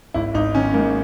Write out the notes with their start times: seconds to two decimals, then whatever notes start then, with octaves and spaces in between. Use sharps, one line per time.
0.14 G#1 E4
0.34 G#1 D#4
0.55 D#3 C#4
0.74 G#2 A#3